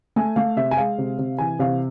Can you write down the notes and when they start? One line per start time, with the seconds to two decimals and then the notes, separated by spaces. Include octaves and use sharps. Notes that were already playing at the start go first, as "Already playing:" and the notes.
0.16 A3 G#5
0.36 A3 F5
0.56 C3 E5
0.71 G#5
0.77 G#3 F5
0.98 C3
1.18 C3
1.38 E3 G#5
1.59 C3 F5